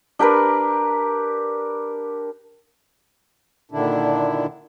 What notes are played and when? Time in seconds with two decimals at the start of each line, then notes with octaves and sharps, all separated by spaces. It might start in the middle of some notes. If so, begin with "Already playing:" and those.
0.19 D4 G4 A#4 B4
3.71 A#2 D3 D#3 D4 E4